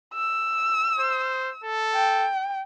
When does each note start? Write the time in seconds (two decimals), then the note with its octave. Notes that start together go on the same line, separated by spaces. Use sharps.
0.14 E6
0.99 C5
1.64 A4
1.94 G5